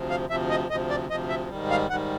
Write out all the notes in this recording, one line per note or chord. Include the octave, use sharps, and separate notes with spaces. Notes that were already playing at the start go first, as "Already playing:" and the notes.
Already playing: D2 C3 F3
F5
D2 C3 F3 E5
D#5
D2 C3 F3 D#5
D5
D2 C3 F3 D#5
E5
G#2 D#3 G3
F5
G#2 D#3 G3 F#5